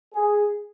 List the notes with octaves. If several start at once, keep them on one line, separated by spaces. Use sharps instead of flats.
G#4